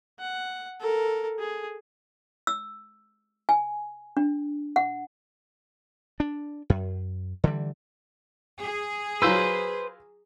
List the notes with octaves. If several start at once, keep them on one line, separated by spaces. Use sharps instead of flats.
F#5
A4 A#4
G#4
E6
G#5
D4
F#5
D4
F#2
D3 E3 G3
G#4
F#3 F4 B4 C5 E6